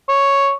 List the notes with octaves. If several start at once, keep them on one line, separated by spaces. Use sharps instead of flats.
C#5